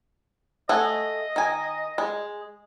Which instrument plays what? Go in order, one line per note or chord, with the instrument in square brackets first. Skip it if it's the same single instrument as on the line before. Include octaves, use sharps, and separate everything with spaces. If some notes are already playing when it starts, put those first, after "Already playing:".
[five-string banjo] A3 F#5 G#5 [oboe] D#5
[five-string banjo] D#3 G#5
G#3